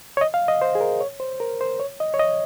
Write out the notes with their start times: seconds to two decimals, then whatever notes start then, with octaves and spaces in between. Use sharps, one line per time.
0.17 C#5
0.21 D#5
0.34 F5
0.48 D#5
0.62 C5
0.75 G#4
0.81 A#4
1.00 C#5
1.20 C5
1.40 A#4
1.61 C5
1.80 C#5
2.00 D#5
2.14 C#5
2.19 D#5